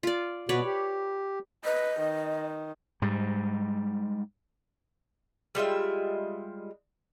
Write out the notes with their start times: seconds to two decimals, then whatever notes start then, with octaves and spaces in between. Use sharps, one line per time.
0.03 F4 D5
0.49 B2 F#4 B4 C#5 D5
0.65 G4
1.65 B4 D#5
2.01 D#3
3.02 G#2 G3
5.55 G3 G#3 F4 E5